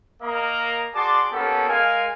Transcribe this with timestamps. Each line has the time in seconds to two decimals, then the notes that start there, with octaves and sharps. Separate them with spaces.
0.23 A#3 D#5 A#5
0.95 F#4 G#4 D5 A5 C6 D6
1.32 A#3 B3 C#4 G4 A4
1.68 G#3 A#4 F5 G#5